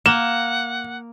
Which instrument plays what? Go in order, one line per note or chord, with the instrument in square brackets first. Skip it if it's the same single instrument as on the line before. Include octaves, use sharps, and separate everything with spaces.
[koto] A#3 [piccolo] F#5 [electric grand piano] E7